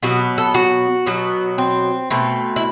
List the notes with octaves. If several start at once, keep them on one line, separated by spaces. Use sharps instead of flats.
B2 F#3 B3 F#4
A4
F#4
B2 F#3 B3
C4
B2 A3 C4
E4